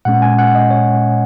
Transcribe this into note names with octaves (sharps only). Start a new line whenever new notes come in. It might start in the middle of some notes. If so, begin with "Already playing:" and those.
A#2 G#3 C#4 F#5
G#5
F#5
D#5
C#5